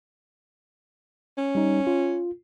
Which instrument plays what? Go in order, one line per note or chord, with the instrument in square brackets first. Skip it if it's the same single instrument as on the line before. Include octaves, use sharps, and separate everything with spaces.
[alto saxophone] C#4
[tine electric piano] G3 D#4
F4